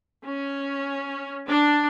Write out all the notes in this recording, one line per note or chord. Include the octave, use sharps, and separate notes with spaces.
C#4
D4